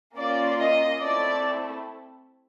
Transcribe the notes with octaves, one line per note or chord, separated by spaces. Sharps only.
A#3 C#4 F4 D5
D#5
A3 C4 E4 A4 D5